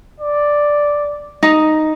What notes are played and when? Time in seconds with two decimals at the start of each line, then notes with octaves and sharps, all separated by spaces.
0.20 D5
1.43 D#4